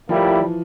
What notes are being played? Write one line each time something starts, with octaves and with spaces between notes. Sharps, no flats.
A2 F3 G3 A#3 E4 G4
E3